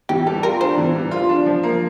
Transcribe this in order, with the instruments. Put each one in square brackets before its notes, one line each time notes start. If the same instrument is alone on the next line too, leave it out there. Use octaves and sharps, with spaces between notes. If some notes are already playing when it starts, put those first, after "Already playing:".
[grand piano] E3 [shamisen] G4
[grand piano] G3 [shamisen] A4
[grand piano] F4 [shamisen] A#4
[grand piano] D4 [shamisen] C5
[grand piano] E3
G3
F4
D4
F3
A#3